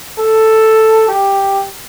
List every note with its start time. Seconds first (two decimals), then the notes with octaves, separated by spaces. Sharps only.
0.18 A4
1.08 G4